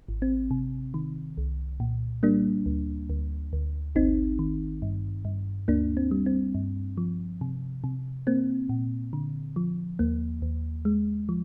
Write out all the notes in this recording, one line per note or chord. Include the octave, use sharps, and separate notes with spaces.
G#1
C4
C3
D#3
C2
A#2
G3 A#3 D4
D2
D2
D2
G#1 C4 D#4
D#3
G2
G2
D2 A#3 D4
C4
G3
C4
G2
F3
C3
C3
A#3 C4
A#2
D3
F3
D#2 A#3
D#2
G#3
F3